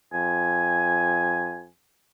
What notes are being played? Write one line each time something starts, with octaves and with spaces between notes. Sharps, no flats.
F2 G#5